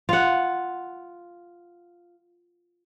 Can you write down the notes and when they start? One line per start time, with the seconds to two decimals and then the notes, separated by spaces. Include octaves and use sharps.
0.09 F4 F#5